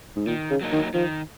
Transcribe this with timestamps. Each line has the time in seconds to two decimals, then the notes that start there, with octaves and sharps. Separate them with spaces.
0.16 G#2
0.27 A#2 D#3
0.50 C#3
0.61 F#3 A#3 D#4
0.72 D#3
0.94 D#3 F3